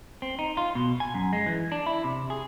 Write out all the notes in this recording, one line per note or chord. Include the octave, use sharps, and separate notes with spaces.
C4
D#4
F4
B2
G#5
F#2
G#3
E3
D4
E4
C3
G#4